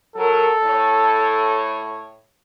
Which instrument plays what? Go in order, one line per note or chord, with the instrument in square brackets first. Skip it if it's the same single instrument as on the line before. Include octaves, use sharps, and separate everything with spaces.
[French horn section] F#3 A#4 [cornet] A4
[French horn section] A2 C#5